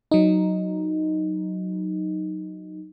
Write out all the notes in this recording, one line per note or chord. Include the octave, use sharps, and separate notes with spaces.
F#3 D#4